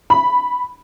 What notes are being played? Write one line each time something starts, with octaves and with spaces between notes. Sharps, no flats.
B5